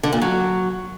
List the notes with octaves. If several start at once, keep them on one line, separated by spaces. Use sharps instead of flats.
D3
A#2
F#3